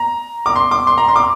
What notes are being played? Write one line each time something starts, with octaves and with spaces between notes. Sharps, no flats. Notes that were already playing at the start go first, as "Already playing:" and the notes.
Already playing: A#5
D6
C6
D6
C6
A#5
C6
D6